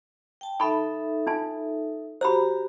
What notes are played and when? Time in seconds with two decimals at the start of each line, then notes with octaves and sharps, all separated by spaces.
0.41 G5 A5
0.60 D#4 A4 E5 A5 B5
1.27 D4 F4 A5
2.21 F#4 G4 C5 A#5 B5